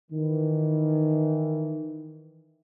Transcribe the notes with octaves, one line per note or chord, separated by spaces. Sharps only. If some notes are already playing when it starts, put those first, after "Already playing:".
D#3 E3